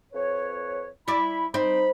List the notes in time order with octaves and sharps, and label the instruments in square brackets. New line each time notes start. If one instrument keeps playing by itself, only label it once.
[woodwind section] F2 B4 C#5
[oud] E4 D5 [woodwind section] B5
[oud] C4 [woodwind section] D#4 B5